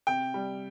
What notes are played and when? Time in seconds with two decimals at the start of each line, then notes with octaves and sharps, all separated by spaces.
0.07 C3 G5
0.34 G3